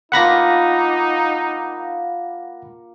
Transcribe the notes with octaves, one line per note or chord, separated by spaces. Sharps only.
A#3 D4 D#4 F4 F#5 B5 A#6